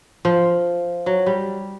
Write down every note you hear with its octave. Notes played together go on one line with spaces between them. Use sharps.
F3
F#3
G3